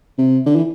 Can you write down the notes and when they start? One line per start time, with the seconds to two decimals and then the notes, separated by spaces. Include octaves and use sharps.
0.18 C3
0.46 D3
0.56 E3